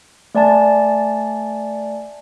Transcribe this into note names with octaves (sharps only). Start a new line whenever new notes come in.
A3 D5 G#5 A5 A6